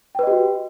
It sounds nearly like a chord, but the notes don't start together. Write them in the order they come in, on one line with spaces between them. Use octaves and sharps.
G5 B4 D#5 G4 F#4